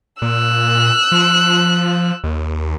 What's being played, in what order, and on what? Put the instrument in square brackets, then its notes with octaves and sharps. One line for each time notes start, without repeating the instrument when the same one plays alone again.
[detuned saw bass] A#2 [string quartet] E6 F#6
[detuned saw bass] F3
D#2